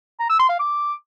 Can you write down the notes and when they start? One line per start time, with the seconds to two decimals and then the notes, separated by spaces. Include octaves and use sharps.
0.20 A#5
0.30 E6
0.39 C6
0.49 F5
0.59 D6